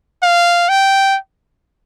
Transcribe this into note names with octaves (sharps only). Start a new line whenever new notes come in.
F5
G5